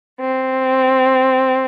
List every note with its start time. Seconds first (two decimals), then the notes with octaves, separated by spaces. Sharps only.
0.20 C4